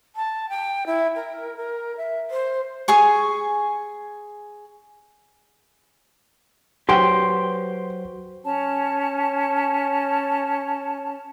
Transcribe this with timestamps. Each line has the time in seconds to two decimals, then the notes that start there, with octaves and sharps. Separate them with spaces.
0.16 A5
0.49 G5
0.87 E4
1.16 A#4
1.57 A#4
1.97 E5
2.31 C5
2.88 G#4 G#5 C#6
6.89 F#3 F#4 G4 B4 C5 G5 C6
8.44 C#4 C#5 A5